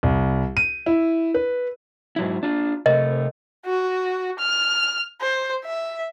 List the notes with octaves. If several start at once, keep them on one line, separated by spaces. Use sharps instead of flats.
C2
D#7
E4
B4
G#2 F#3 E4
D4 F4
C3 A3 A#4 D#5
F#4
F6
C5
E5